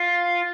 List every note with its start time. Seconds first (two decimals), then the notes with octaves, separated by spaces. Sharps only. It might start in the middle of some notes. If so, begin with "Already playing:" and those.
Already playing: F4